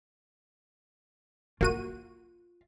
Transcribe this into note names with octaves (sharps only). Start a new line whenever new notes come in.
A#3 F4 F#4 D#7